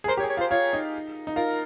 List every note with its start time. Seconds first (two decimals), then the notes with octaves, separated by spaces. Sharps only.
0.04 G#4
0.08 A#4 C5
0.17 G4 C#5
0.23 G#4
0.30 C#5
0.37 F4 C5
0.51 F4 C#5
0.73 D#4
1.27 D#4
1.36 F4 A#4